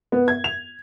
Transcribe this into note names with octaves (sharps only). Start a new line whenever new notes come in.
B3
G#6
F7